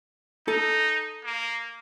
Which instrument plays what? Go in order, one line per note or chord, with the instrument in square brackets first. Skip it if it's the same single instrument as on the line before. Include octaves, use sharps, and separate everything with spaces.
[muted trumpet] D#4 [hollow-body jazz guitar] A4
[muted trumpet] A#3